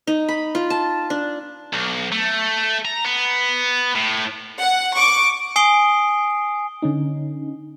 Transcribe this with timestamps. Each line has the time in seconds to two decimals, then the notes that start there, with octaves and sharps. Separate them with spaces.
0.07 D#4
0.29 B5
0.55 F4
0.70 A5
1.10 D4
1.73 B1
2.12 A3
2.85 A#5
3.05 B3
3.96 A2
4.59 F#5
4.96 C#6 D6
5.56 G#5 D#6 C7 D7 G7
6.82 D3 C#4 D#4